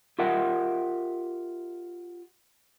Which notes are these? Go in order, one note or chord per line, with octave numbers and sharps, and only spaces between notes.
F4 G4 A#4 E5 F#5